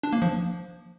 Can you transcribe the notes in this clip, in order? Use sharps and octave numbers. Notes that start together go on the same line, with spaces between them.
D4
A#3
F3